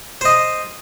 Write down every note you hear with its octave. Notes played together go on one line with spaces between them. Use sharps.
C5 D#5